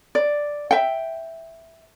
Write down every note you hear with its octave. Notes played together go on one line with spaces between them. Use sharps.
D5
E5 G5